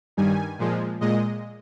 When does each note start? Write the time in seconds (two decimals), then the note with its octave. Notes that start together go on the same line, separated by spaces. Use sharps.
0.17 G2 D#3 G3 G#5
0.59 A#2 F3 G#3
1.01 A#2 G#3 D#5